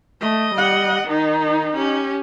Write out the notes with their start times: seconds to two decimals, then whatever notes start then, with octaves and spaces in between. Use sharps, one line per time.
0.21 A3 D#5
0.55 G3 F#5
1.08 D#3 D#4
1.75 C#4 G4